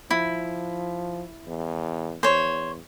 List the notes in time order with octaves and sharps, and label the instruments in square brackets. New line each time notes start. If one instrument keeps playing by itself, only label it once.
[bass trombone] F3 [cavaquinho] E4
[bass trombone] E2
[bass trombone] E2 [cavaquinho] C5 C#5